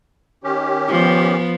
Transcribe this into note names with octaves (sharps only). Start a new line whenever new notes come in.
D#3 C#4 G4
F3 B3